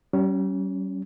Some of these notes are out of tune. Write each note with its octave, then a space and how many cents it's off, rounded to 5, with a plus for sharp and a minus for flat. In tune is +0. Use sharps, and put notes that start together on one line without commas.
G3 -40 C#4 +0